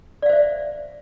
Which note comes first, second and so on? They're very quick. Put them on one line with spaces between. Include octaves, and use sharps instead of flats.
D5 F5 C5 E5